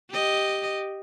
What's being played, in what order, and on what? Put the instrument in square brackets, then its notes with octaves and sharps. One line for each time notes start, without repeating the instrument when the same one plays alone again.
[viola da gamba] G4 D#5